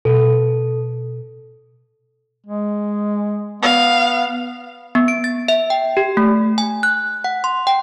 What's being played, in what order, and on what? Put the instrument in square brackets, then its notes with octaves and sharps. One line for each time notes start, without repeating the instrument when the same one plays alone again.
[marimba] B2 [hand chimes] A4
[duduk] G#3
[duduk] B3 [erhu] F5
[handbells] B3
D7
A6
E5
G5
G4
A3
G#5
F#6
F#5
C6
G5